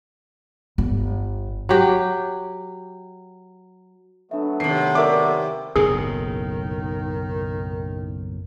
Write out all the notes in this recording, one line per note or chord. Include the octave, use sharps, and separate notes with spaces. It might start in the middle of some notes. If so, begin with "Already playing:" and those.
G1
F#3 G4
F#3 A3 B3 D4 E5
D#2 C3 C7
A#4 D5 E5 C#6 D6
F#1 B1 A2 D#3 G#4